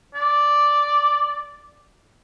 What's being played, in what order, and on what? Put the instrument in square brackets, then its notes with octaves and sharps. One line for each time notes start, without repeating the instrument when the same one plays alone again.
[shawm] D5